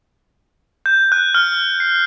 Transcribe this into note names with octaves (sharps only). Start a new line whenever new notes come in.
G6
F#6
F6
C7